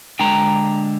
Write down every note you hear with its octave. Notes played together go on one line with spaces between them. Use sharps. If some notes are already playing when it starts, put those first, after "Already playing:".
D3 G#3 D4 G5 A#5